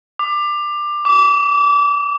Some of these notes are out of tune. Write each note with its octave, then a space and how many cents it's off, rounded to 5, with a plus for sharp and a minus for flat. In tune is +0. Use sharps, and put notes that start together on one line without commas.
D6 +20
D6 -30